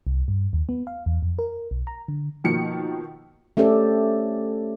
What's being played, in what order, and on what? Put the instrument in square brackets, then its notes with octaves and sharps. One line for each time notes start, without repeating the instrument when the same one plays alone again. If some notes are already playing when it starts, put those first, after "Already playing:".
[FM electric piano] C2
G2
D#2
B3
F5
E2
F2
A#4
B1
A#5
D3
[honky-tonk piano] B2 D#3 F3 A#3 C#7
[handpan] A3 C#4 G4 A4 C5 D5